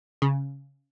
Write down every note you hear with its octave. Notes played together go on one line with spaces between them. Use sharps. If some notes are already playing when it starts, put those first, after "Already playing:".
C#3